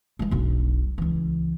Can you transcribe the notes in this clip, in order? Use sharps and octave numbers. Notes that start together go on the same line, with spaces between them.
E3 G#3
E1 B1
C#2 E3